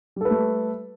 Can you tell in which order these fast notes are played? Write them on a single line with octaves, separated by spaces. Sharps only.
G3 A4 B4 A3